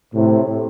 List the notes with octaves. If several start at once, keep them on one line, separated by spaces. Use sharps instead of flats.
A2 C3